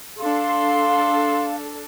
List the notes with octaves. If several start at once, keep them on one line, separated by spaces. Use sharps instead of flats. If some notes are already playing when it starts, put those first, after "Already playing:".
D4 A4 F5 C6